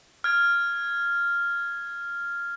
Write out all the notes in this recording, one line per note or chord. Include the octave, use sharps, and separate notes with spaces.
F6 G#6